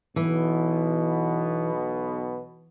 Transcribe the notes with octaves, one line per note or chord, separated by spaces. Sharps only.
B1 B2 E3 B3